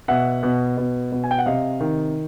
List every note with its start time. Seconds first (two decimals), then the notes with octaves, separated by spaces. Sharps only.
0.08 B2 E5 F#5
0.43 B2
0.77 B2
1.12 B2
1.24 G#5
1.31 G5
1.39 F#5
1.46 C3 D#5 F5
1.80 D#3